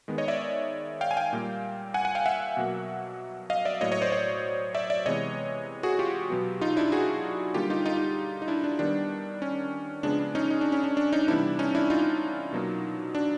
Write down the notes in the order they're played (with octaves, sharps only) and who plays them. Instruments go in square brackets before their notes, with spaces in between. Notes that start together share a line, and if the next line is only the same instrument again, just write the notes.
[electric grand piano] D#3 G#3 B3
C#5 D#5
D5 E5
F5 G5
G#5
F5 G5
A#2 G3 A#3
F#5 G#5
F#5 G#5
F5 G5
E5 F#5
B2 F#3 A#3
D#5 F5
D5 E5
A2 F#3 A#3 C#5 D#5
C#5 D#5
C5 D5
C#5 D#5
D5 E5
D5 E5
C3 E3 G#3 B3 C#5 D#5
F#4 G#4
F4 G4
B2 F#3 B3
D#4 F4
D4 E4
F#4 G#4
D3 G3 A#3 F4 G4
D#4 F4
D#4 F4
D#4
D4 E4
D4
D#3 G3 B3 D4
C#4
C#3 F3 G#3 B3 D4
D4
C#4 D#4
D#4
D4
C#4
D4
D4
C#4 D#4
C3 E3 G3 B3 D4 E4
C#4 D#4
D4 E4
D#4 F4
B2 F#3 A#3
D4